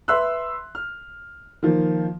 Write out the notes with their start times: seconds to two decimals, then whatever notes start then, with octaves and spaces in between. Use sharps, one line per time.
0.08 B4 E5 C6 E6 F#6
0.75 F6
1.63 D#3 F3 A#3